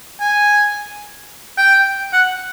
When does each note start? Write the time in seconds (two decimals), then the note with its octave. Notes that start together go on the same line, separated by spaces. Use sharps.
0.21 G#5
1.58 G5
2.13 F#5